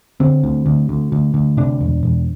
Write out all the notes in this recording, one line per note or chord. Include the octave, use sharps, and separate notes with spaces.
D3 C4
D2
D2
D2
D2
D2
C3 D4
E1
E1